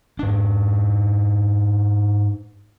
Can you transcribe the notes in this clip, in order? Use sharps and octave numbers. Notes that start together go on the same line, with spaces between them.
G#2 D4